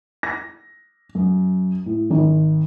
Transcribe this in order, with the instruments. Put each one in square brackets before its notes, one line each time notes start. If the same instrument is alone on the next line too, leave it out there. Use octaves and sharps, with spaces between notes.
[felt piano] A#6
F#2
A2
G#1